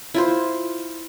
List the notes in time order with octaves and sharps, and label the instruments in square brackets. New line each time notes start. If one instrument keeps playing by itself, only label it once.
[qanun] E4 F4 C5